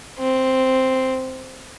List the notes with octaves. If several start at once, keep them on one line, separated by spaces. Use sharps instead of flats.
C4